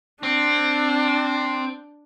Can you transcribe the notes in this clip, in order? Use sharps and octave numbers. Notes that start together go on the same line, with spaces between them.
C4 D4